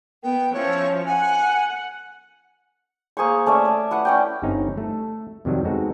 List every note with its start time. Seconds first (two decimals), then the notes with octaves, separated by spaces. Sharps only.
0.23 B3 G5
0.54 F3 C#4 C#5 E5
1.06 F#5 G#5
3.17 A#3 G#4 C5 C#6
3.46 A3 C#4 D5 E5
3.65 D5 A5
3.91 E4 B4 F#5
4.05 C#4 D5 G5
4.42 G1 G2 C4 C#4 D#4 A#5
4.78 A3 A4
5.45 F2 C3 D#3 F#3 G3
5.65 G#3 B3 C4 D#4 F#4 A4